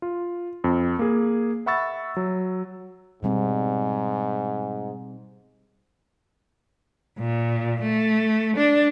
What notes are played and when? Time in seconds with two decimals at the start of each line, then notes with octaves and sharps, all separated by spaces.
0.02 F4
0.64 F2
0.99 A#3 G#4
1.66 E5 F#5 B5 C#6 E6 A6
2.17 F#3
3.23 G#2 B2 G3 C4
7.18 A#2
7.82 A3
8.56 D4